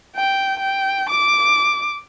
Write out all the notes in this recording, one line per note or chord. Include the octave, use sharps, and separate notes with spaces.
G5
G5
D6